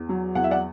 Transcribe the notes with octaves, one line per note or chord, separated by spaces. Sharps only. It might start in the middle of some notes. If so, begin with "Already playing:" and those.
Already playing: E2
F#3
E2 F#5
E5
D5 F#5